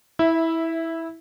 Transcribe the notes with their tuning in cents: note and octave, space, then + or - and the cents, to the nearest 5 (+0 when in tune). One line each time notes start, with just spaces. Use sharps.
E4 -15 E5 +0